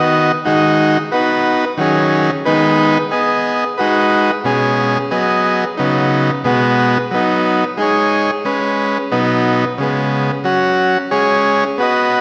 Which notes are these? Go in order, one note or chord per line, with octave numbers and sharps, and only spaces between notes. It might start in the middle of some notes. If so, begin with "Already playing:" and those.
Already playing: D#3 B3 F#4 D#5
D#3 G#3 D#4 F#4
B3 D#4 F#4 B4
D#3 F#3 C#4 G#4
D#3 G#3 B3 D#4 B4
B3 G#4 D#5
G#3 D#4 F#4 B4
B2 G#3 C#4 G#4
F#3 B3 G#4 D#5
C#3 F#3 B3 D#4
B2 G#3 B3 F#4
F#3 B3 D#4
G#3 D#4 G#4 C#5
G#3 C#4 B4
B2 F#3 B3 D#4
C#3 G#3 B3
F#3 C#4 F#4
G#3 C#4 G#4 C#5
B3 F#4 B4 D#5